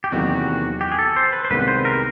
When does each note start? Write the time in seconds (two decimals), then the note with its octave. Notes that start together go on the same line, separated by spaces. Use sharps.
0.04 G4
0.12 E2 C3 D#3 F#3 A#3 F#4
0.81 G4
0.92 G#4
0.99 A4
1.16 C5
1.33 B4
1.45 C5
1.50 C2 C3 D#3 G#3 B3 B4
1.68 C5
1.85 A#4